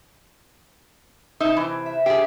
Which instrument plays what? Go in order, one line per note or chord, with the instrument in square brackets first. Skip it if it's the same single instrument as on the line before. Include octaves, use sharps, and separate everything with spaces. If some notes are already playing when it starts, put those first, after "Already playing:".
[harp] C3 A5 [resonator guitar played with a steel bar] D#4 E5
[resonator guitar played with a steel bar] E3
[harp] E5
[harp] D4 [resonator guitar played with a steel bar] G4 G#4